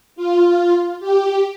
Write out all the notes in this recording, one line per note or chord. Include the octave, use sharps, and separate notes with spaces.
F4
G4